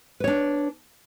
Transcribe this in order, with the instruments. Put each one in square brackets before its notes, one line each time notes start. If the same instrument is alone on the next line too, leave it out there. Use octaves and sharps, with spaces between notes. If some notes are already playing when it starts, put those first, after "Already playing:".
[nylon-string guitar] B4
C#5
D4